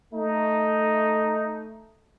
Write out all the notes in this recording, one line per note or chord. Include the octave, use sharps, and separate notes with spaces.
A3 D#4